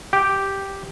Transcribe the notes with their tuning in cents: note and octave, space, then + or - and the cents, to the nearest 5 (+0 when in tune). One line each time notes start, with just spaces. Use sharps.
G4 +0 G5 -10